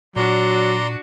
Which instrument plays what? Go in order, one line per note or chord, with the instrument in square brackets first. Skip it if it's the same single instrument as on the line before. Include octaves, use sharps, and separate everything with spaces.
[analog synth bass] A#2 [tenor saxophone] F#3 [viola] D4 F#4 [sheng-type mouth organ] D5 A#5 C6